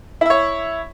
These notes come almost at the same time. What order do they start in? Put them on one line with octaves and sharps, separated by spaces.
E4 E5 C#5